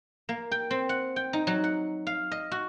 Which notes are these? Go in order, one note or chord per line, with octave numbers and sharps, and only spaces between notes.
A#3
G5
C4
F#5
G5
D#4
F#3
F#5
F5
D#5
F#4